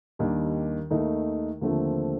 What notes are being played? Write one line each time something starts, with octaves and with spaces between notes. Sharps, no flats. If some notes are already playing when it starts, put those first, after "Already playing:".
D#2 D#3 G3 D4
D#2 D#3 A3 D#4
D#2 D3 F3 A3 C4